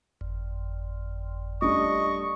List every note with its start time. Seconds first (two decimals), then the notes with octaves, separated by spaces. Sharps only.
0.21 G1 F2
1.62 G3 A3 D4 D#5 C#6